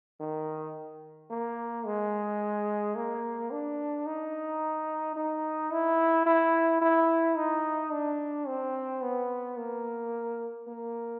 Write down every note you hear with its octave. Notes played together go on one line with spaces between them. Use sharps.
D#3
A#3
G#3
A#3
D4
D#4
D#4
E4
E4
E4
D#4
D4
C4
B3
A#3
A#3